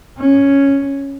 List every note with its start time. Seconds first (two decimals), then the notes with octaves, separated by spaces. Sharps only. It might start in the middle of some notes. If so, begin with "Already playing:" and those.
0.18 C#4